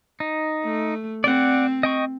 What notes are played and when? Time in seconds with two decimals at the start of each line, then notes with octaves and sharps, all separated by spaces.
0.20 D#4
0.64 A3
1.24 C4 D5 F#5
1.83 D#5 G5 C#6